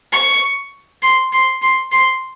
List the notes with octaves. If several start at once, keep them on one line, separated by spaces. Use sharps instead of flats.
C#6
C6
C6
C6
C6